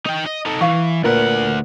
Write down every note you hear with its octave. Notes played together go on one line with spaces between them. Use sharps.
D#4 G5
D#5
D#4 A4
E3 F5 C#6
D2 A#2 A#4 B4 F#5